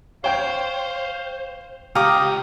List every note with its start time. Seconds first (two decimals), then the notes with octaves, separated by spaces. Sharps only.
0.24 C5 C#5 F5 G5 G6
1.95 C#2 G4 F5 A#5 D6 D#6